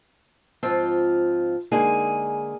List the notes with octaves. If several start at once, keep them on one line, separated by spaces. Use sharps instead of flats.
G#2 F3 C4 F4
D3 G#3 A#3 D#4 G#4 G#5